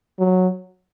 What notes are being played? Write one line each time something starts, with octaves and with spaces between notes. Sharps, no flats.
F#3